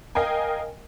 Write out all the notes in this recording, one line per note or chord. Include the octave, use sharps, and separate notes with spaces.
A#4 D#5 F5 G5 G#5